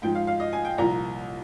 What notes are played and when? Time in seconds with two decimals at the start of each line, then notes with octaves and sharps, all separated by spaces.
0.02 G#2 F3 G5
0.15 F5
0.27 F5
0.40 D#5
0.53 G#5
0.65 G5
0.78 C2 A#2 F3 A#5